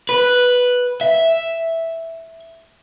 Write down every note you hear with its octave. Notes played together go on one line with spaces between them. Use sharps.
B4
E5